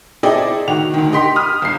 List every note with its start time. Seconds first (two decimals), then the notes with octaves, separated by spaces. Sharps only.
0.23 C4 E4 G#4 A4 D5 D#5
0.68 D#3 F#4 F7
0.94 D2 D#3
1.12 G4 D#5 G5 C6 B6
1.36 B5 D#6 F6
1.62 G1 C7